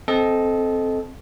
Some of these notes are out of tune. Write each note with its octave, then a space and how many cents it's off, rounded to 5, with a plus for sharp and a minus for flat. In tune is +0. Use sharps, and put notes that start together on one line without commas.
C4 +0 A4 -20 D#5 +0